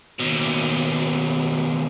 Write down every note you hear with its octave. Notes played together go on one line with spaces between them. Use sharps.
D#2 B2